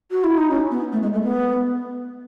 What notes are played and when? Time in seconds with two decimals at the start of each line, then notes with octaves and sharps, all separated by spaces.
0.11 F#4
0.24 E4
0.37 D#4
0.50 C#4
0.71 B3
0.92 A3
1.02 G#3
1.13 A3
1.23 B3